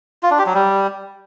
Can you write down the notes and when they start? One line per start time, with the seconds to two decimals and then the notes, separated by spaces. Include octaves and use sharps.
0.23 F4
0.31 D4
0.39 G4
0.46 F#3
0.54 G3